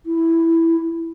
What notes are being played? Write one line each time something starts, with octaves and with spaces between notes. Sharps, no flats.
E4